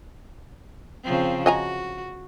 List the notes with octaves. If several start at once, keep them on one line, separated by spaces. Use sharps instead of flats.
C#3 F3 C4
F#4 D#5 G#5 A#5